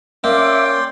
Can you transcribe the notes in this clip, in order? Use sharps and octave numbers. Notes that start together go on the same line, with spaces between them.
A#3 C#4 D5 E5 G5 C6 D6